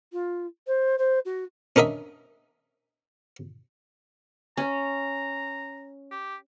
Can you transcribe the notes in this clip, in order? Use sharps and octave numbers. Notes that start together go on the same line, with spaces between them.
F4
C5
C5
F#4
C#4 D4 A#4 D#5 E5
C#4 A#5
G4